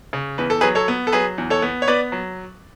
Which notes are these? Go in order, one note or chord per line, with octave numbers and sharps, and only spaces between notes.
C#3
E2 B4
A4
F#3 G#4 B4
A4 C#5
B3
A4
F#3 G#4 B4
E2
A4 C#5
B3
C#5
B3 B4 D5
F#3